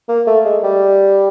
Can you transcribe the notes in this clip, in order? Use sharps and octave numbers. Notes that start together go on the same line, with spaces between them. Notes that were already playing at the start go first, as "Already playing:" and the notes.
A#3
A3
G#3
G3